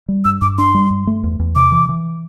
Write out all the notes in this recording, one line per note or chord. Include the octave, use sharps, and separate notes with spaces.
G3
G2 E6
G2 D6
D4 C6
G3
G2
A3
E2
E2
C3 D6
E3
E3